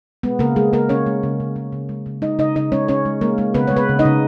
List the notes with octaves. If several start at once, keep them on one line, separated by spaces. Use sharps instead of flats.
G#3 B3
C#3 A#3 A#4
G#3 G#4
C#3 A#3 A#4
C#3 C#4 C#5
G#3
C#3
C#3
G#3
C#3
G#3
C#3
G#3 D#4 D#5
C#3 D#4 D#5
C#3 D#4 D#5
G#3 C#4 C#5
C#3 C#4 C#5
G#3
G#3 A#3 A#4
G#3
C#3 B3 B4
G#3 C#5
B3 B4
C#3
D#4 D#5
C#3